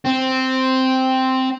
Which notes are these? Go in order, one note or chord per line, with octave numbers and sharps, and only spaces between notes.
C4